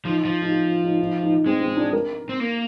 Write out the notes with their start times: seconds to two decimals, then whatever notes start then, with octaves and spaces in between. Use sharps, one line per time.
0.05 F3 D#4
0.25 F3
0.42 D#4
0.52 F4
0.84 D#4
0.99 D#4
1.23 D#4
1.46 G#3 C4
1.61 C4
1.77 D4
1.93 A#4
2.29 C4
2.40 A#3